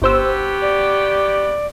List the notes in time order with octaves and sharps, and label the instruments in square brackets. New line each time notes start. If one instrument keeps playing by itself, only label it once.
[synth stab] G1 C5 E6 [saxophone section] B3 F#4 G4
[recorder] D5